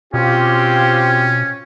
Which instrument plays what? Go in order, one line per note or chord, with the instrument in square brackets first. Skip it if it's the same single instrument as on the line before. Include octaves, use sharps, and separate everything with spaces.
[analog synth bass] B2 [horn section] C4 G4 [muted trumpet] C#4 [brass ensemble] F4